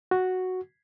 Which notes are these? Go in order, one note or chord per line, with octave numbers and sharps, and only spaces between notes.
F#4